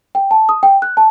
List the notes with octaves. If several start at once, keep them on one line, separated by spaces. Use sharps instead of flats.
G5
A5
D#6
G5
F#6
A5